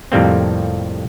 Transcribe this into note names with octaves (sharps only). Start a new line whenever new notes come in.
F2 A2 C3 G3 A#3 C4